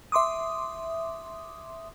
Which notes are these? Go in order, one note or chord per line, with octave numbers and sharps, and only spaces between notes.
E5 C6 D6 D#6